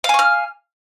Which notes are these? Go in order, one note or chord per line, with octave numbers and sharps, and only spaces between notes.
F5 G#5 C#6 F6